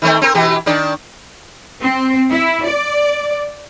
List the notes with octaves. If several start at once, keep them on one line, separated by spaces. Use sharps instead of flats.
D#3 A3 C4
C4 A#4
B2 E3 G4
D#3 D4 D5
C4
E4
D5